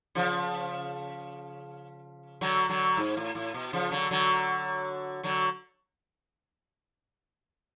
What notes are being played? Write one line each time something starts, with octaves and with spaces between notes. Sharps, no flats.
C#3 F3
D3 F#3
D3 F#3
G#2
A2
A2
B2
C#3 F3
D3 F#3
D3 F#3
D3 F#3